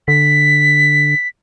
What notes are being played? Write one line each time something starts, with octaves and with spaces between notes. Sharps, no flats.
D3 B6